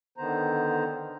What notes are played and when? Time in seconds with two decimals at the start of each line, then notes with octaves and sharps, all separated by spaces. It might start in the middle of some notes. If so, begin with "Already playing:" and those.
0.18 D3 D#3 B3 C5 A#5